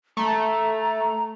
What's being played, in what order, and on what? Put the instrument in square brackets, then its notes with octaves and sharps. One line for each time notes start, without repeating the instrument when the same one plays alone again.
[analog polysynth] A3 [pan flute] A#5